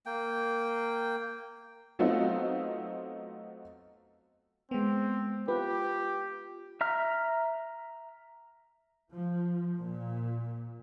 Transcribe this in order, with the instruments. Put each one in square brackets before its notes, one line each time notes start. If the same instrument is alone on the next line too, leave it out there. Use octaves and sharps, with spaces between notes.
[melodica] A#3 G5
[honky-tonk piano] F#3 A3 B3 C4 D#4 F4
[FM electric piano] G#3 B3 [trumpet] C4
[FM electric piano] F4 [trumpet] G4 [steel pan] B4
[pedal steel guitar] E5 A#5 F6
[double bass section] F3
A#2